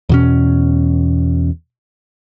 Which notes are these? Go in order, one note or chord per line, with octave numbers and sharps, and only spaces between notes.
E2 B2 C#4